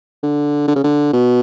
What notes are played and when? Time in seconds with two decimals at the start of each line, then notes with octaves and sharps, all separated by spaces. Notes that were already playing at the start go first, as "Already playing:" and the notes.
0.23 D3
0.68 D3
0.76 C#3
0.84 D3
1.13 B2